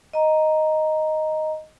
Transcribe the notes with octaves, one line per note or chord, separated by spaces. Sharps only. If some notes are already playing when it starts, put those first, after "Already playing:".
D#5 A#5